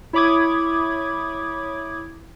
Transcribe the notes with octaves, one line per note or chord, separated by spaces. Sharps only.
E4 C#5 B5 D6 D#6 G#6